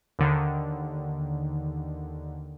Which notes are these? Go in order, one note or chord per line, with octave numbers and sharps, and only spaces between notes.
D#2 D3 D#3